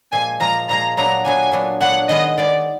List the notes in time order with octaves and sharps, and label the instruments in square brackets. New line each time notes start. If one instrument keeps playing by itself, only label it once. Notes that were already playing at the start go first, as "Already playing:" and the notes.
[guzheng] A#2 F3 G#3 [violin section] G#5
[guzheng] A#2 F3 G#3 [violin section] A#5
[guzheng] A#2 F3 G#3 [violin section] A#5
[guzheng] A#2 F#3 B3 D4 [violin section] A#5
[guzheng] A#2 F#3 B3 D4 [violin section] G#5
[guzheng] A#2 F#3 B3 D4
[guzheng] A#2 F#3 B3 D4 [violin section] F#5
[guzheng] D#3 G#3 B3 [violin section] D#5
[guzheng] D#3 G#3 B3 [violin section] D5